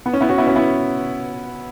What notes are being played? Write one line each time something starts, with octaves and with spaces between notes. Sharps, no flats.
B3
C#4
B3 E4
C#4 F#4
B3 E4
C#4 F#4
B3 E4